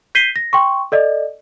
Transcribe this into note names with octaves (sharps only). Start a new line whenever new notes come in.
G6 B6 C7 D#7 G7
A#6
G5 C6 C#6
A4 D5 D#5